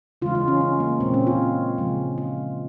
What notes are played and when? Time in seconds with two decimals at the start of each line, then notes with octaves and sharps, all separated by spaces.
0.22 C#3 E3 G#3 F4
0.35 F4
0.48 C#4
0.61 C#4
0.80 A#3
1.00 A#2 G#3 C4
1.14 C#4
1.27 F4
1.78 C#3 F3 G#3
2.18 F4